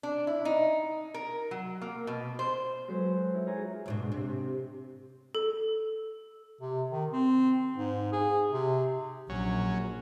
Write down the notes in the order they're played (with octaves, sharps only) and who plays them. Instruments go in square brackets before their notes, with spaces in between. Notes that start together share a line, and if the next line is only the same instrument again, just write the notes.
[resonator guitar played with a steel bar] D4
E4
D#4
A#4
F#3
A#3
B2
C5
[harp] F#3 G#3 F#4 A4 B4 C5
D#4 E4
F4 G#4 C#5 G#5 A#5
[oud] D2 G#2 B2
C3
[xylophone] A4
[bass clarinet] C3
D#3
C4
G#2
G#4
C3
[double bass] A#1 [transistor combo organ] F#3 C#4